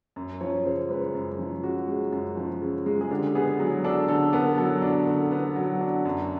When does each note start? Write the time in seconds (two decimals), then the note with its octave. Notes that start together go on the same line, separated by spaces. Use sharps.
0.16 F#2
0.41 F3 C#5
0.65 C#3 C5
0.89 G#3 B4
1.15 F#2
1.39 F3
1.63 C#3 F#4
1.88 G#3
2.12 F#2
2.37 F3
2.62 C#3
2.86 G#3
3.01 G#4
3.11 D3 G4
3.35 B3 G#4
3.60 F#3 G#4
3.84 D4 A4
4.08 D3 A4
4.33 B3 A#4
4.58 F#3 A4
4.82 D4
5.07 D3
5.32 B3
5.56 F#3
5.81 D4
6.05 F#2